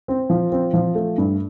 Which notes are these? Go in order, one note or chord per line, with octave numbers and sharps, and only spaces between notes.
C4
F3
C4
F3
A3
G2